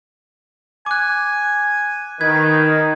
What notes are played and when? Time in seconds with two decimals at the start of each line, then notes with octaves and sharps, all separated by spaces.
0.86 G#5 D6 F#6
2.21 D#3 B4 G#6